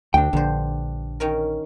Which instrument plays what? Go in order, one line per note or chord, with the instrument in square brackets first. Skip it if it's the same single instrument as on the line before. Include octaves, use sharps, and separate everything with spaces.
[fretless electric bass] D2 [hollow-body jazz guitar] D4 G5
[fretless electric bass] A#1 D3 [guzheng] G2 C5
[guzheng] D#3 C#4 A#4